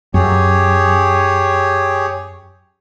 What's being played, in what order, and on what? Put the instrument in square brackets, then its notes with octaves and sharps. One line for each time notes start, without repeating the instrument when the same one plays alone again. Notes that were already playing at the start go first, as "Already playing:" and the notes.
[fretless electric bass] F#2 [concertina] G4 G#4 C#5